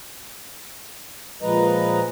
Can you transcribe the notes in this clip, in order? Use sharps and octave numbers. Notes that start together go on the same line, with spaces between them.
A#2 F3 G#3 B4 D#5 A#5